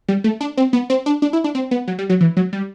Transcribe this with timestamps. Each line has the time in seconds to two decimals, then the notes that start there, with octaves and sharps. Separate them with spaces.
0.08 G3
0.24 A3
0.41 D4
0.57 C4
0.73 B3
0.90 C4
1.06 D4
1.22 D4
1.33 E4
1.44 D4
1.55 C4
1.71 B3
1.88 F#3
1.99 G3
2.10 F#3
2.21 E3
2.37 F#3
2.53 G3